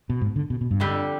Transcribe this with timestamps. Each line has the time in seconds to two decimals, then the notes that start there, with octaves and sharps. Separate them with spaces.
0.10 B2
0.21 G#2
0.36 D3
0.50 B2
0.61 B2
0.71 G2
0.80 F2 D3 G3